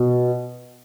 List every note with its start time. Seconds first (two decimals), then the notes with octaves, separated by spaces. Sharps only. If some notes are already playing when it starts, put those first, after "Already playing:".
Already playing: B2